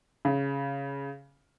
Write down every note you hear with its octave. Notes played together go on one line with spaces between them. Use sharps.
C#3